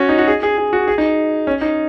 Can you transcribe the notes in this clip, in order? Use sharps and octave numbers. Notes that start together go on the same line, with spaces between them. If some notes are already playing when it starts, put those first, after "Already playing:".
Already playing: C#4 F#4
D#4
F#4
G#4
G#4
G#4
F#4
G#4
D#4
C#4
D#4